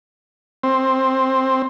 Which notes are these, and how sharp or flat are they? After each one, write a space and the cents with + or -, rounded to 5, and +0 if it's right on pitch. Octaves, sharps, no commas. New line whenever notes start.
C4 +10